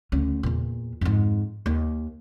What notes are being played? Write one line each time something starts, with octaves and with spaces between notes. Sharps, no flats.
D2 C#4
E2 A#2
F2 G#2
D#2